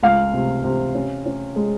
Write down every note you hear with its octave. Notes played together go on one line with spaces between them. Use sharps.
C#2 F5
C3
C3
C#4
C#4
G#3